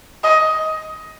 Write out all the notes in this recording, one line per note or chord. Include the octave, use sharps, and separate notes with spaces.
D#5